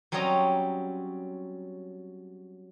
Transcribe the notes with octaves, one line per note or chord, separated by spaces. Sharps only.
F#3 G3 C4 C#4 D#5 A#5